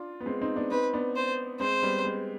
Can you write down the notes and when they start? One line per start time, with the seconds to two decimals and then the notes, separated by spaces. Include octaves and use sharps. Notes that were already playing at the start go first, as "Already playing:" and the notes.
Already playing: D4 F4
0.21 B3
0.26 G#3 C4
0.41 C4 D#4
0.56 B3 D4
0.71 C4 D#4 B4
0.93 B3 D4
1.16 C5
1.60 G#3 C4 C5
1.83 G3 B3
2.05 G#3